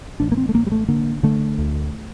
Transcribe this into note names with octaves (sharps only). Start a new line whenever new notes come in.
A1 D4
A#3
C4
A3
A1 A#3
G3
A3
D3 A#3
D3 A3
D2